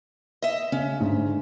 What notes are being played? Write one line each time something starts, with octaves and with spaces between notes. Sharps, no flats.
D#5 E5
C#3 C#4
G#2 D3